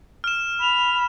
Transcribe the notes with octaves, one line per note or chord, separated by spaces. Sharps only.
F6 E7
B5 F7